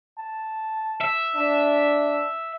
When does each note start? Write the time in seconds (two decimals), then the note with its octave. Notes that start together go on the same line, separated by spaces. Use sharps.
0.18 A5
1.01 E5
1.36 D4